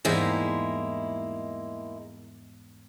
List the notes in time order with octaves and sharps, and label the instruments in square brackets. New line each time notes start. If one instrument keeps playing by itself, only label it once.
[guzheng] E2 G#2 G3 [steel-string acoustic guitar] G#3 A#3 E4